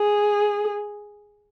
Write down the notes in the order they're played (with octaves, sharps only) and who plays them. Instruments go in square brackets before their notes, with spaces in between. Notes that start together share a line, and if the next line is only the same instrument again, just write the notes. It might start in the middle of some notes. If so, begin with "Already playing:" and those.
Already playing: [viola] G#4